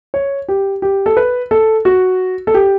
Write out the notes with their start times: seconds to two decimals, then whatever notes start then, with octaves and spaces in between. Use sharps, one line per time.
0.14 C#5
0.49 G4
0.82 G4
1.06 A4
1.17 B4
1.51 A4
1.85 F#4
2.47 A4
2.54 G4